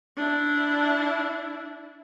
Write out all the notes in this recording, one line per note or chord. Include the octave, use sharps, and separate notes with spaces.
D4 E4